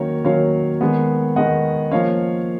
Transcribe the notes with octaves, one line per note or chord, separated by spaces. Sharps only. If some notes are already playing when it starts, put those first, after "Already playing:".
Already playing: D#3 F#3 A#3 C#4 A#4 C#5
D#3 F#3 A#3 C#4 C#5 F5
D#3 G#3 B3
D#3 G#3 B3 D#5 F#5
F3 A#3 C#4 C#5 F5